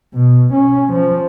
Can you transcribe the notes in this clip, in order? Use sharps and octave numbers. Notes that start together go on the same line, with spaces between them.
B2
C#4
F3